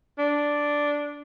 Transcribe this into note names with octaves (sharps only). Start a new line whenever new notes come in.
D4